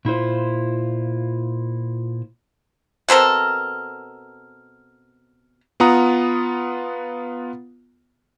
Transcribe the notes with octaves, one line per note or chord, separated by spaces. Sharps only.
A#2 E4 F4 C5
B2 C4 A4 A#4
B3 F4 F#5 A#5 D#6